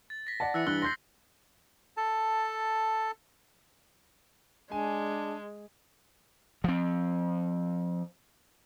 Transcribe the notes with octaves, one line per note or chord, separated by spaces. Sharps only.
A6
A#6 B6
D5 F#5 A5
E3 E6 F#6 C#7
G2 E3 E6 F#6 G7
C6 G6 A#6 C7
A4 A5
G#3 D4 G#5
F3 C4